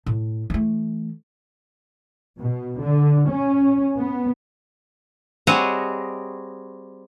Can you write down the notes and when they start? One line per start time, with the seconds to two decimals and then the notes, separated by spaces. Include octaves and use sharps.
0.06 A2
0.50 E3 A3
2.39 B2
2.80 D3
3.29 C#4
3.98 B3
5.47 G3 C4 F#4 G#4 C#5 D#5